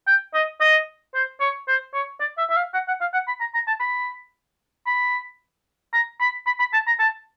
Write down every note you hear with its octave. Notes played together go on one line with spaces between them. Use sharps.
G5
D#5
D#5
C5
C#5
C5
C#5
D5
E5
E5
F5
F#5
F#5
F5
F#5
B5
A#5
A#5
A5
B5
B5
A#5
B5
B5
B5
A5
A#5
A5